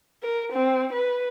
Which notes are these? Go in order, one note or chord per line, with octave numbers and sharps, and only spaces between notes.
A#4
C4
B4